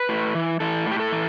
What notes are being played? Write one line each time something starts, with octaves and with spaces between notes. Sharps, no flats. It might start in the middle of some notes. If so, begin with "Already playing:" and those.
Already playing: B4
A2
E3
E3 A4
A2 G4
A4
E3